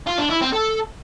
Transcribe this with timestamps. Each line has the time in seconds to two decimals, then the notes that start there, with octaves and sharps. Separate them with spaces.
0.07 F4
0.18 D4
0.30 E4
0.41 C4
0.53 A4